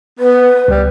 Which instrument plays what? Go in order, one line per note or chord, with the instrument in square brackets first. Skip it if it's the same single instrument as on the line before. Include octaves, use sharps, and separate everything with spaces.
[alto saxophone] B3 [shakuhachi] B4
[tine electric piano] C#2 [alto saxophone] G3